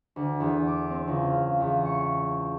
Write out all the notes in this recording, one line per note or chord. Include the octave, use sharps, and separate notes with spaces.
D2
E2
D6
C4
C#2
F5
E2
C#6